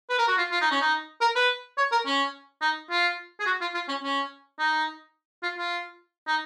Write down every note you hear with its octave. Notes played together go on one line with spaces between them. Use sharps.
B4
A#4
F#4
F4
F4
D#4
C#4
D#4
A#4
B4
C#5
A#4
C#4
D#4
F4
G#4
F#4
F4
F4
C#4
C#4
D#4
F4
F4
D#4